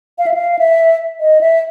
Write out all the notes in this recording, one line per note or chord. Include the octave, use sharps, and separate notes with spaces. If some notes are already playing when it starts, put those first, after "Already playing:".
F5
E5
F5
E5
D#5
E5